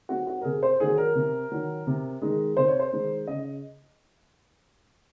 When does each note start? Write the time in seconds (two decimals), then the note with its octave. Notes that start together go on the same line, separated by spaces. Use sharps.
0.09 F#3 C4 D#4 F#4
0.27 F#4
0.41 A#4
0.44 C3 G#4
0.63 C5
0.80 D#3 F#3 G#4
0.98 A#4
1.15 C3
1.52 D#3 F#3
1.87 C3
2.22 D#3 G#3 D#4
2.57 C3 C5
2.68 C#5
2.80 C5
2.92 D#3 G#3 D#4
3.27 C#3 D#5